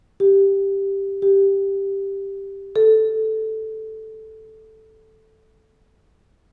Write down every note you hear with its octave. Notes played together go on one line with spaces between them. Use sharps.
G4
G4
A4